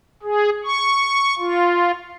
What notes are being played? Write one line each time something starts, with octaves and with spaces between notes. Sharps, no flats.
G#4
C#6
F4